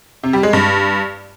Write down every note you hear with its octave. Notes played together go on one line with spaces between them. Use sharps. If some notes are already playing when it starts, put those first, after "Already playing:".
C3
G3
G#3
G2